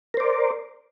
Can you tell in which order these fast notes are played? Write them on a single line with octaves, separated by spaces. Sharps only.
A#4 C5 D5